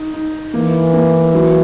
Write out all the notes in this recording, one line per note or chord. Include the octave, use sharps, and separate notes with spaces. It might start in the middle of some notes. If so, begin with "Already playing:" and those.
Already playing: D#4
D#4
E3 A#3
A#3
F#3